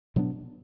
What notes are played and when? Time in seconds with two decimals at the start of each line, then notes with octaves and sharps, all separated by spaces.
0.16 B2 F#3 B3 D4